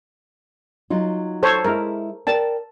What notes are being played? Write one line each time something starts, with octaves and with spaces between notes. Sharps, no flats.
F#3 D#4 F4
A4 C5 C#5
G#3 E4 A#4
A#4 D5 G5 A5